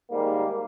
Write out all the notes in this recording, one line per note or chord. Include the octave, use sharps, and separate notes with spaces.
G#2 D#3 G3 A#3